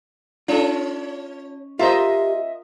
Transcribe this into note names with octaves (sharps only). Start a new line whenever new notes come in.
C#4 F4 A4
F4 G4 A#4 C5 D#5 E5